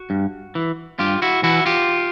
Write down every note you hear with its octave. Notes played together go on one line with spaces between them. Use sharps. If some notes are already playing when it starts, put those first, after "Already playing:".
Already playing: F#4
G2
E3
G2 F4 G4
E4 F#4
E3 E4 F#4
F4 G4